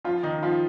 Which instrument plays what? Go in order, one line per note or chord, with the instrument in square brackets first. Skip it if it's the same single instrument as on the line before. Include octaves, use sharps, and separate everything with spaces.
[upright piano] F3 F4
D#3 D#4
F3 F4